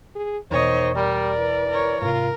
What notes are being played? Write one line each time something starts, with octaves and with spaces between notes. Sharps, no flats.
G#4
E2 B2 D#3 C5 C#5 D#5
G3 A#4 D5
E3
A#4 C#5
G#2 C3 F4 A#4